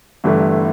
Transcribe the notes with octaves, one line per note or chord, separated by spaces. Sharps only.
G1 G2 E3 A3 E4